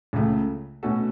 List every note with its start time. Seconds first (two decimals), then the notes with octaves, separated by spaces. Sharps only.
0.13 C#2 C#3 A3
0.83 B2 A3 C#4 F#4 A4